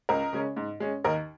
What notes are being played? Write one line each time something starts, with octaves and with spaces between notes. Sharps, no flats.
C#2 A#4 D#5
C#3 G#3 C#4
G#2
G#3 C#4
D#2 A#4 D#5